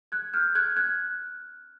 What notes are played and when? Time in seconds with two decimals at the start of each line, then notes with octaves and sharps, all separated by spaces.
0.12 F#6 G#6
0.34 F6 G6
0.55 F#6 G#6
0.76 F#6 G#6